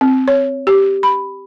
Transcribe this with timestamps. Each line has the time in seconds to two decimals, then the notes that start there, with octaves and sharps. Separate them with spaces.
0.01 C4
0.28 C#5
0.67 G4
1.03 B5